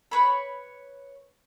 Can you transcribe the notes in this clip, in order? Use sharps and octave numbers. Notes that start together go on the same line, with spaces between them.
B4 C#5 B5